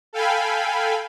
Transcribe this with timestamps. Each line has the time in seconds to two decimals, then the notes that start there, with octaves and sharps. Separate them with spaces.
0.13 A4 F5 G5 G#5 B5